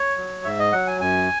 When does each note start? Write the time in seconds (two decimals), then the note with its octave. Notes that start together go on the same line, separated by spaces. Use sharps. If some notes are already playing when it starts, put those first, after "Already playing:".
Already playing: C#5
0.17 F#3
0.44 G#2 E5
0.59 D#5
0.72 F#3 F#5
0.87 G#5
1.01 F#2 G#5